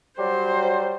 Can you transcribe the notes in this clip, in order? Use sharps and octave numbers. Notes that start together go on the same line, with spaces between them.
F#3 G3 C5